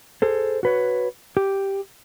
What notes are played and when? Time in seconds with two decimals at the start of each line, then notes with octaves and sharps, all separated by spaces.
0.22 G#4 A4 C5
0.63 F#4 B4 C#5
1.37 G4